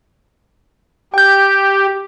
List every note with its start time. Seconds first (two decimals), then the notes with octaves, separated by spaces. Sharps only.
1.14 G4 G5 G6